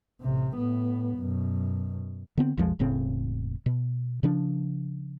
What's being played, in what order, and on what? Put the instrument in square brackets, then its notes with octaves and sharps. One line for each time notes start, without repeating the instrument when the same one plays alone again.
[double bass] A1 C3
A2 B3
F#2 B2
[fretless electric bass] D3 B3 C4
B1 F2 F3 G#3
E1 A2 C#3 C4
B2
C#3 F3 D4